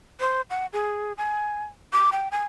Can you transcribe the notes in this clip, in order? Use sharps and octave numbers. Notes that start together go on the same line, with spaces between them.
C5
F#5
G#4
G#5
D6
G5
G#5